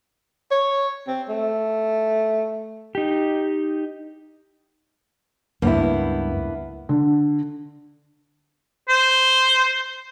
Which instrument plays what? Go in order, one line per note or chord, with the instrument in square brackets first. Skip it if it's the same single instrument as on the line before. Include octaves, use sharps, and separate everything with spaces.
[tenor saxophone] C#5
C4
A3
[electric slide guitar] D#4 G4
[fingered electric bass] C#2 [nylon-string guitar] G2 [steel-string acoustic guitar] A#3 B3 E4
[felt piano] D3
[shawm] C5